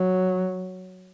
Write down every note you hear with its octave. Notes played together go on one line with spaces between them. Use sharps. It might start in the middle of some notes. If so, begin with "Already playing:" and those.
Already playing: F#3